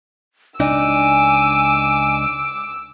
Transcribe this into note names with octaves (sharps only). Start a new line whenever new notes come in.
C#2 D4 D#4 G#5 D6 E6